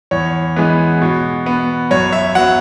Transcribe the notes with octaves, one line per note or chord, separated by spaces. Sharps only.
E2 C#5
E3 G#3 B3
B2
B3
F#2 C#5
E5
F#3 B3 F#5